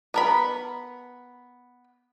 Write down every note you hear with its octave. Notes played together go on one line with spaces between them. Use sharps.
B3 A#4 B5